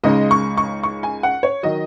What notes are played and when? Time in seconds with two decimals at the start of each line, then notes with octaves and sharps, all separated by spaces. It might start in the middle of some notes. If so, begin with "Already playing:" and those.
0.04 C#2 C#3 G#3 D#4 D#5
0.31 C#6
0.57 C#6
0.83 C#6
1.03 G#5
1.23 F#5
1.43 C#5
1.63 D#3 F#3 D#5